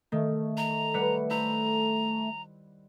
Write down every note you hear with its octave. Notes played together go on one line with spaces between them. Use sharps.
D#3 A3
A#5
G3 B4 F#5
E4 C5 A#5